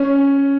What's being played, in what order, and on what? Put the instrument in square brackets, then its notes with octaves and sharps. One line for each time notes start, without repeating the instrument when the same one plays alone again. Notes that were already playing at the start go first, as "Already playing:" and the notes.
Already playing: [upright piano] C#4